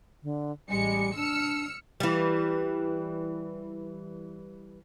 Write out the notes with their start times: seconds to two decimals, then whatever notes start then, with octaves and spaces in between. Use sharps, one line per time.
0.23 D3
0.69 A1 G3 G#3 C#7
1.16 D4 E6 F6 C#7
2.00 E3 G3